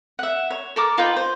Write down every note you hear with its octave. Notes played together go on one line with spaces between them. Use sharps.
E5 F#5
C#5
A4 A#4 D6
D#4 F4 B4 G5
C5